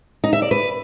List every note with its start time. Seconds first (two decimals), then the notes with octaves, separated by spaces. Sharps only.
0.24 D#4
0.33 E5
0.42 D5
0.51 B4